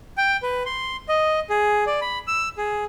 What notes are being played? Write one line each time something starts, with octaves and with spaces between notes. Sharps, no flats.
G5
B4
C6
D#5
G#4
D5
B5
E6
G#4